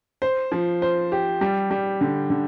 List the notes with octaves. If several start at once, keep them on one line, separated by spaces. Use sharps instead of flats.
C5
F3
C5
G4
G3
G3
D3
D3